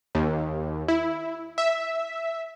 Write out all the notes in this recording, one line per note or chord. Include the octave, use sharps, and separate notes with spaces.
D#2
E4
E5